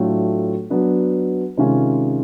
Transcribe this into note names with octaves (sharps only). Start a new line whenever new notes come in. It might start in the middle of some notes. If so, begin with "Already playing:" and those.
Already playing: A2 F#3 A3 D4 F4
F#3 B3 D4
C3 D#3 G#3 C#4 F4